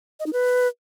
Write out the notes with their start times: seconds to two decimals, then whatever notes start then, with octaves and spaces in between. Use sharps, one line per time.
0.20 D#5
0.26 D#4
0.33 B4